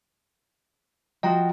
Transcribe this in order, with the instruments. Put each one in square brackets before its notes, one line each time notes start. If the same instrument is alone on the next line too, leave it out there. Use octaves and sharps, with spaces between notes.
[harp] F3 F#4 [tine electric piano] D#5 G5 A#5